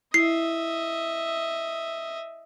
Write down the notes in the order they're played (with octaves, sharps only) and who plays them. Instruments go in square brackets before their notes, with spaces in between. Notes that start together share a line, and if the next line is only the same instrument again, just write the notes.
[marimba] E4 [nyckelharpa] D#5 E5 [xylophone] C7